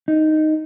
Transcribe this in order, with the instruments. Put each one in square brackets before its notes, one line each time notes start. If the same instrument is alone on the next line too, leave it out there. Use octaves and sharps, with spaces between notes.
[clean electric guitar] D#4